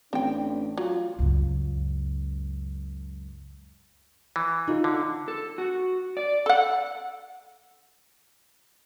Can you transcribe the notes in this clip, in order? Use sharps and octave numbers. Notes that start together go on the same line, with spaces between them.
A1 C4 D4 G5
F#3 F4
C#2 F#2
E3
D#4 F4
D3
A4
F#4
D5
A4 F#5